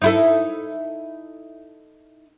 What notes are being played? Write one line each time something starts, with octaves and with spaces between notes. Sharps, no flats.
D#4 E4 A4